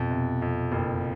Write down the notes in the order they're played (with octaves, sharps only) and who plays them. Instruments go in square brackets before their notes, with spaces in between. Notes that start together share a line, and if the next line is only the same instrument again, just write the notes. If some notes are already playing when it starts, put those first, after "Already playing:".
Already playing: [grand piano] F2 [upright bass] B2
[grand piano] C3
F2
F#1